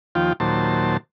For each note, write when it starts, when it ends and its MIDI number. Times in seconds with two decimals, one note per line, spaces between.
0.15 0.33 39
0.15 0.33 53
0.15 0.33 65
0.15 0.33 79
0.40 0.97 39
0.40 0.97 46
0.40 0.97 54
0.40 0.97 72
0.40 0.97 81